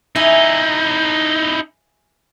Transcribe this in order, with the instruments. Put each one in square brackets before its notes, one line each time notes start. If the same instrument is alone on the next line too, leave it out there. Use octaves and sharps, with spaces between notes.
[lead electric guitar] D#4 E4 [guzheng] E5 G#5